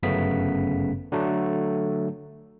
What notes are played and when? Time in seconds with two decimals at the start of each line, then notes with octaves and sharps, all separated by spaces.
0.03 G1 F#2 C#3 A3 B3 B6
1.12 D3 F#3 A3